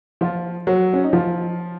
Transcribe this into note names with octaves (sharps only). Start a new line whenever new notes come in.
F3 F4
F#3 F#4
C#4
D#4
F3 F4